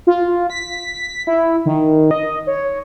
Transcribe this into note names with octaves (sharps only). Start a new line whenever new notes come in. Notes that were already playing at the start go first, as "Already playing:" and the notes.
F4
B6
E4
D#3
D#5
C#5